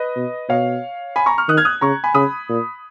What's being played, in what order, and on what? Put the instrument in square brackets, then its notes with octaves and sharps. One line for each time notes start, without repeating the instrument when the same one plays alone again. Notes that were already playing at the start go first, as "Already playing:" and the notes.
Already playing: [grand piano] B4 D#5
[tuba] B2
[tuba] B2 [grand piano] C#5 F5
[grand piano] G#5 B5
A#5 C#6
C#6 F6
[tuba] D#3 [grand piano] D#6 F#6
[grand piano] F6 G#6
D#6 F#6
[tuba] C#3 [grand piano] A#5 C#6
[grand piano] G#5 B5
[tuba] C#3 [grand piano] B5 D#6
[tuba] A#2